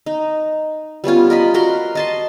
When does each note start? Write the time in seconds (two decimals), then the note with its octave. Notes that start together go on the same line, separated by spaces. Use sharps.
0.06 D#4
1.04 G3 B3 C#4 F4
1.30 A#4 D#5 B5
1.54 F#4 A#4 C6
1.95 D#5 A5 C6